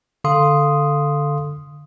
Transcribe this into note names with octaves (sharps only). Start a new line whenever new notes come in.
D3 A4 F5 C6 D#6